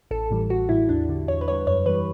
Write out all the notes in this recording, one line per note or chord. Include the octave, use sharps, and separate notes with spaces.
A1 A4
A2 E3 G3
A1 F#4
A2 E3 G3 E4
E2 D4
D3 G3
E2 C#5
B4
D3 G3 C#5
F#2 C#5
E3 G3 B4